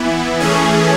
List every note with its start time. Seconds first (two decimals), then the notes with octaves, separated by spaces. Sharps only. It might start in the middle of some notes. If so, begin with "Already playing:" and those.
Already playing: E3 B3 E4
0.40 E3 A3 C#4 G#4